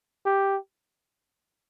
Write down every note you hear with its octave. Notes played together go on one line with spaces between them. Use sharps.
G4